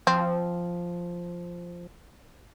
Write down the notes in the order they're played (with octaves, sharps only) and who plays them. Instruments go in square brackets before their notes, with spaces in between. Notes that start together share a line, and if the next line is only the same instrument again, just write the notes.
[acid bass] F3 [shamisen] C4